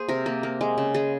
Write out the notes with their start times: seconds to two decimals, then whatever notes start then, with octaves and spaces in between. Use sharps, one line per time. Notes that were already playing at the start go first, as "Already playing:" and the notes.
Already playing: A#3 G#4 C5
0.08 C3 A#4
0.26 A#3
0.43 A#3
0.61 G#3
0.78 C#3
0.94 G#3 G#4